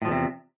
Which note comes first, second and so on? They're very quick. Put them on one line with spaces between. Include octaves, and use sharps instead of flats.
A2 F3 E2 C3